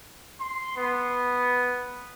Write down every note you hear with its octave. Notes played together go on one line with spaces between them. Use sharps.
C6
B3